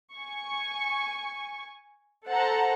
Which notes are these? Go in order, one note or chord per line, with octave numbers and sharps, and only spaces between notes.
G#5 C#6
A4 C5 F#5 A5 A#5